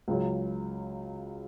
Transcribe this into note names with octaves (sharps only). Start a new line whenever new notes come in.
C#2 C#3 F#3